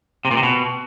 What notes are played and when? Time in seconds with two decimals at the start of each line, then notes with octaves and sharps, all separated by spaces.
0.25 C3
0.31 A#2
0.37 C3
0.43 B2